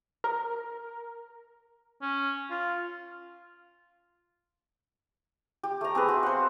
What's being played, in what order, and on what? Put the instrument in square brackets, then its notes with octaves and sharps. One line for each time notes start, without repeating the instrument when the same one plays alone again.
[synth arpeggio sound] A#4
[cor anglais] C#4
F4
[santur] G4
A3 A#5
C4 G#4 B4
F#4
C5 F5 F#5